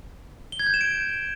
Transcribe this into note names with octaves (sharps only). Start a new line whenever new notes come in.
G7
G#6
G6
E7
D7